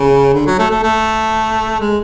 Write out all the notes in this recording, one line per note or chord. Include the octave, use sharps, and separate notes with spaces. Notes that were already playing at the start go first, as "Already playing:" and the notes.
Already playing: C#3
D3
F#3
A3
A3
A3
G#3